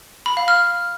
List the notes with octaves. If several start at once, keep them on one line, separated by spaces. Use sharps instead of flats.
B5
F5
F6